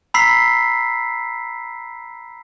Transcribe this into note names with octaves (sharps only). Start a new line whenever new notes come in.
A#5 B5 E6 B6 C7